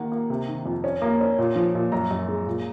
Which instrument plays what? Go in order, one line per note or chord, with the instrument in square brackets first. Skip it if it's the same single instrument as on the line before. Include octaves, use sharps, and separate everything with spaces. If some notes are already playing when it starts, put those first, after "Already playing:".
Already playing: [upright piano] D#3 A#3 F#5
A#3
C3
D#3
F2
C#4
A#3
C#4
A#2
F3
A#2
F#2 A#5
F#2
G#3
A#2